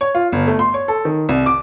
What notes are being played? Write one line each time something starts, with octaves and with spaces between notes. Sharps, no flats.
C#5
F4
G1
A3
C6
C#5
A4
D#3
C2
D6